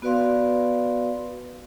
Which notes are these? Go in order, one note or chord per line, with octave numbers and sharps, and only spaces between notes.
B3 F#4 B4 D5 F5 C6